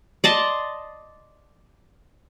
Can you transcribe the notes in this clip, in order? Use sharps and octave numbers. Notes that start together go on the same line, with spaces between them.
D5 D#5 A5 C6